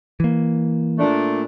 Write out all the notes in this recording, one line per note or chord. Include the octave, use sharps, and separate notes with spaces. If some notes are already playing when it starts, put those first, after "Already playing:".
E3 A#3
A#2 A3 D4